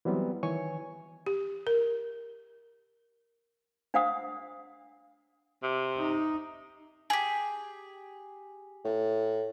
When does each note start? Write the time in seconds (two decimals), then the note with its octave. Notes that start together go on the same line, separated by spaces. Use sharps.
0.05 E3 F#3 G3 B3 C4
0.43 D#3 E3 C#5 G#5 C#6
1.26 G4
1.67 A#4
3.94 D4 C5 F5 F#5 D#6
5.63 C3
5.98 D#4
7.10 G4 G#4
8.85 A2